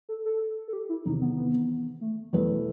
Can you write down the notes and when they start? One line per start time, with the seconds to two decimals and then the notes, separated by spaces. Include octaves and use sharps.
0.09 A4
0.25 A4
0.68 A4
0.73 G4
0.89 E4
1.05 E2 C3 D#3 D#4
1.21 B3
1.36 B3
2.01 A3
2.33 E2 B2 G3 A3 E4 B4